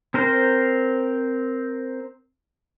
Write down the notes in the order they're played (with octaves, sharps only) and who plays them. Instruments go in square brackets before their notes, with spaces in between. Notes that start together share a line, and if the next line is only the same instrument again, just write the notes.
[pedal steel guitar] C4 A#4 C5